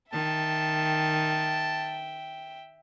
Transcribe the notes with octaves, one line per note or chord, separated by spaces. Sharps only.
D#3 E5 G5 A5